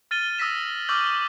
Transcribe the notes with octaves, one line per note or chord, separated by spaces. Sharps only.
F6 A6 D#7 G7
D#6 E6 A#6 B6 E7
C#6 D6 E6 F6 G6 F#7